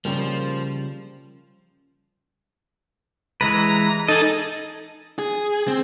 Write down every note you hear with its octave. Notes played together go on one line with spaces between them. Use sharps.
C#3 F3 G3 A#3
E3 G#3 B4 A#5
D#4 G#4 A4 D#5
G#4
C4